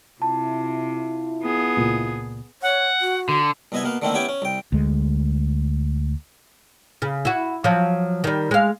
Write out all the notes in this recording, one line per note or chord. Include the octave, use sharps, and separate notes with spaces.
C3 E4 F4 A5
B3 G#4
C#2 A#2
C#5 F#5
F#4
D3
C2 B2 B3 D#5 E5 G#5
B2 A#3 B3 F5
D3 D#3 A3 A#3 C4 E4
B3 C#4 E4 G4 G5 G#5
C#4
C2 G5
D2 G#3
C#3
E4 F#4
F3 F#3
D#3 G3
G#3 F5